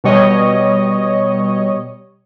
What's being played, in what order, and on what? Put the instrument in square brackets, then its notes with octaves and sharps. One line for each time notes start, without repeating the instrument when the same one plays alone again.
[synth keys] B2 G3 C#5 D#5